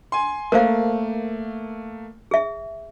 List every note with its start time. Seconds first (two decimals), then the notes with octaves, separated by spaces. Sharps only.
0.12 G#5 C6
0.52 A3 A#3 A#4 C5 F5
2.31 G#4 E5